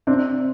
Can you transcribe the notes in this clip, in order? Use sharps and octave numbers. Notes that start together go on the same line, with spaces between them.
C3 C4 D4